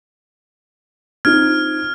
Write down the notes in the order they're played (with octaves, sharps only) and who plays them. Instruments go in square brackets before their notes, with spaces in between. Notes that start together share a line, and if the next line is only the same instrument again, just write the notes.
[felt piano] C4 D#4 F4 [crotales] F6 [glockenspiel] G#6